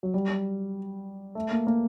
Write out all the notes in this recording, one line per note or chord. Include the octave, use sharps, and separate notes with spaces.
F#3
G3
A3
A#3
A#3